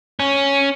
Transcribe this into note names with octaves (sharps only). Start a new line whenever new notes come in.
C#4